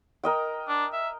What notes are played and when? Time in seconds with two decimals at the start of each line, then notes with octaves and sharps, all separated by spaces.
0.24 A#4 D#5 G5
0.68 D4
0.93 E5